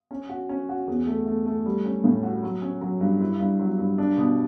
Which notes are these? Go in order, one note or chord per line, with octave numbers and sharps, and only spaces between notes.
C#4
F#4
C#4
F#4
E2
A3
A3
A3
G3
C#4
A2
F#4
F#3
C#4
F#3
G2
E4
G2
F#3
G2
D4
B2